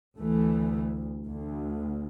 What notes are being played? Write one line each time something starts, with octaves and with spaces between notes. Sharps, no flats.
D2 E3 A3
D2